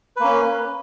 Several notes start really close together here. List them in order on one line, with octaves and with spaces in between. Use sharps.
B4 A#3 C#4